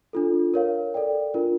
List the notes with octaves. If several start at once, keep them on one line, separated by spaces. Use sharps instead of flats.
D4 F4 A4
A#4 C#5 F5
A4 D5 G5
D4 F4 A#4